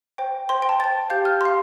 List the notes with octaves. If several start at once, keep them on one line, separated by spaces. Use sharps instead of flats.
C5 G5
C5 G5 C6
G5
A5
C5 G5 A6
G4 F5 G6
F6
G4 F5 C6